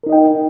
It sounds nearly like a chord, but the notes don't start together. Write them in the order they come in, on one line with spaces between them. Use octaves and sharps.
A#4 D#4 D#5 G5